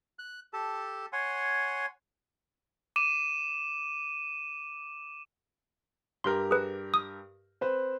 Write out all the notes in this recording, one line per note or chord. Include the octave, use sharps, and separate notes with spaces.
F#6
G4 A4 A5
C#5 F#5 G#5 C6
D6 D#7 E7
G2 G4 A#4 C6
G#4 B4
D#6
C4 B4 C5